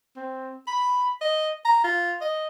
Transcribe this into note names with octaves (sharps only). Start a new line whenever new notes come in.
C4
B5
D#5
A#5
F4
D#5